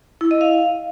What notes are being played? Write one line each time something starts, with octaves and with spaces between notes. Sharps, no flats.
E4
D#5
F5